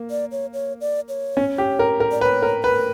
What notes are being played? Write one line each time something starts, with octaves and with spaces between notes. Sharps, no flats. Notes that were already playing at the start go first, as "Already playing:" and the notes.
Already playing: A#3
D5
C#5
C#5
D5
C#5
C#4
G4
A#4
A#4
D5
B4 C#5
A#4
A#4 B4